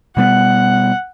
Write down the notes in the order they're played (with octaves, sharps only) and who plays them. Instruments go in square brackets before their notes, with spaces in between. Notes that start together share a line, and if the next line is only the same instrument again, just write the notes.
[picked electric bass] B2 G3 B3 [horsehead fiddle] F#5